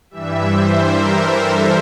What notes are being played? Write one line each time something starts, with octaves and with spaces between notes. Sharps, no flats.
G2 E3 G3 E5
C5
A#4
A4